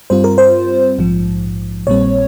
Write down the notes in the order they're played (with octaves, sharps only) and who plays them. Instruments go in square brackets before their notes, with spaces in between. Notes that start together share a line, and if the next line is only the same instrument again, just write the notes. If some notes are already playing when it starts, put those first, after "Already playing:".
[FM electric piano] G2 G3 C4 F4 C5
A#4
C5
A#1 G#2 F3
A#1 A#2 G3 C4 C#5